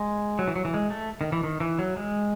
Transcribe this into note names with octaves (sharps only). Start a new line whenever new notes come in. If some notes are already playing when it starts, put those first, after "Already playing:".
Already playing: G#3
F#3
E3
F#3
E3
G#3
A3
D#3
E3
D#3
E3
F#3
G#3